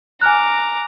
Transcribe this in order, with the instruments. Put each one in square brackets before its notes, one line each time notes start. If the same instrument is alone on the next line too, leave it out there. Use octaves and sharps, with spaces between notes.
[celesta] G#5 F6 F#6 [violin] A#5 D6